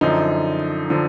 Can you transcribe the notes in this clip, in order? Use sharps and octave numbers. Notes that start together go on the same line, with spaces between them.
F#2 D3 F3 D#4
D3 F3